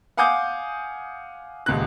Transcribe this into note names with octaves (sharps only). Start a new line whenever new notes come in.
F5 F#5 G#5 D6 D#6 G6
D#1 C#2 F#6